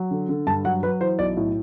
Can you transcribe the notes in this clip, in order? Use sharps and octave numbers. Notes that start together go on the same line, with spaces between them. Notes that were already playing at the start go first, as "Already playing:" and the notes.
Already playing: F#3
D3
D3
G2 A5
F#3 F#5
F#3 B4
E3 C5
B1 D5
A2